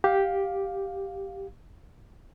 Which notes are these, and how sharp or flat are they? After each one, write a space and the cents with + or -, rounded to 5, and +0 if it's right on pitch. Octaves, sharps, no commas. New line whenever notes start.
G4 +0 F5 +15